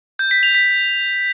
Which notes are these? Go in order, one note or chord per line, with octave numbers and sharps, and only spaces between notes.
G6
B6
F7
B6